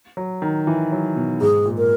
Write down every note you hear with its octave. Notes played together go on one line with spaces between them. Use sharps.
F#3
D#3
E3
F#3
B2
G#2 G#4
A#2
A#4